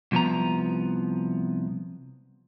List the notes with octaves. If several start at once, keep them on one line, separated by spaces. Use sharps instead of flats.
C2 F3 B3 A#5